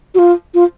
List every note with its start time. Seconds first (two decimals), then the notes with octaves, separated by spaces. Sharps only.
0.15 F#4
0.19 F4
0.54 F4